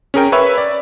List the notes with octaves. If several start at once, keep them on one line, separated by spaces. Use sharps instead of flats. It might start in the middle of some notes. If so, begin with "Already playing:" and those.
C#4 G#4 A#4 G5
B4 C#5 E5
D5